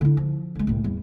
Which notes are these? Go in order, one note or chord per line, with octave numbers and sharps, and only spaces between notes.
D3 E4
F3
D3 G#3
C2 A2
E2 G3